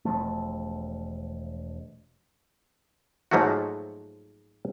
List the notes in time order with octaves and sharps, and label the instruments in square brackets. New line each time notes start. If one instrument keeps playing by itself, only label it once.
[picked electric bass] E1 F3 A3
[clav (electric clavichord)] G#2 F3 F#3 A3 A#3 F#4